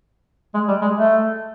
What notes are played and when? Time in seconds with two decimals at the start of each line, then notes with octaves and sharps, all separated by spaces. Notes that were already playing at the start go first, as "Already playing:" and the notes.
0.54 G#3
0.68 G3
0.82 G#3
0.96 A3